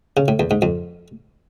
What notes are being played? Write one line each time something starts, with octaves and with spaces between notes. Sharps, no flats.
C#3
A2
E2
G#2
F2